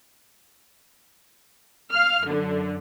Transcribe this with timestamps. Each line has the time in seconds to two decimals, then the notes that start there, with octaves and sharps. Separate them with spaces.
1.93 F5 F6
2.26 F#2 D3